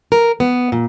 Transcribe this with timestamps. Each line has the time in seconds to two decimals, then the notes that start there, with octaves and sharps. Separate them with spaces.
0.12 A#4
0.40 B3
0.72 A#2